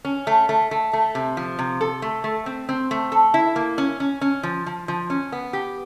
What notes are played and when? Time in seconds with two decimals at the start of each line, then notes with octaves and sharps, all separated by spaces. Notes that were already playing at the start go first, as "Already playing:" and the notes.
0.05 C#4
0.27 A3
0.49 A3
0.71 A3
0.93 A3
1.15 C3
1.37 F3
1.59 C3
1.81 A4
2.02 A3
2.24 A3
2.46 C4
2.69 C4
2.91 A3
3.12 A4
3.34 E4
3.56 A#3
3.78 C#4
4.00 C#4
4.21 C#4
4.43 F3
4.66 F3
4.88 F3
5.10 C#4
5.32 B3
5.53 G4